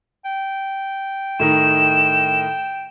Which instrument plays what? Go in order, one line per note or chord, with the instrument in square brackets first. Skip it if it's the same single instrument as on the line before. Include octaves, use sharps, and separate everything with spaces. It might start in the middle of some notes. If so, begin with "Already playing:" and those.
[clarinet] G5
[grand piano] A2 D#3 D#4 [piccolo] E7